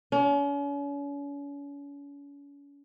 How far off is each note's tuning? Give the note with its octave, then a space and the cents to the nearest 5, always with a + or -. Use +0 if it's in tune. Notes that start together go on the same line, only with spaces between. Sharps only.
C#4 +40